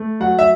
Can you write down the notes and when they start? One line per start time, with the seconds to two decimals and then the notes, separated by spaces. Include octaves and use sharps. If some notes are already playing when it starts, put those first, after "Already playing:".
Already playing: A3
0.20 F#3 F#5
0.39 E5